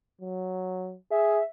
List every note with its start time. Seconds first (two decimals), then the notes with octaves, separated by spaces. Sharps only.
0.21 F#3
1.11 G#4 E5